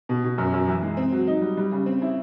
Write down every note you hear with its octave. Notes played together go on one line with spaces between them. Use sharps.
B2
B2
F#2
F#2
E3
G#3
C4
F#3
D#4
G3
G3
C#3
C4
E4